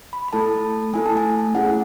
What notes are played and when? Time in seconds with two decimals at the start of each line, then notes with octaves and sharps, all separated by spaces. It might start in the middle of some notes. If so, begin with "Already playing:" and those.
0.13 B5
0.28 B5
0.33 A3 E4 A4 A5
0.93 A3 E4 A4 G#5
1.06 A5
1.17 G#5
1.55 A3 C#4 E4 G#4 F#5